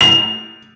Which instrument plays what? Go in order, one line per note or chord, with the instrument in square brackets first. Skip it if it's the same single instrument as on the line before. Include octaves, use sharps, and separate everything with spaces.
[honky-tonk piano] F7